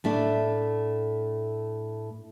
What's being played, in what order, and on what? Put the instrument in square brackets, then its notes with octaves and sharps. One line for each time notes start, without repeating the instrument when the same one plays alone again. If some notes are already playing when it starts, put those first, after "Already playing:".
[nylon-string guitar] A2 A3 D4